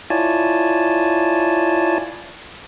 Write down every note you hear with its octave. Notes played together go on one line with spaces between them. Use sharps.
E4 F4 C#5 D5 G#5 A5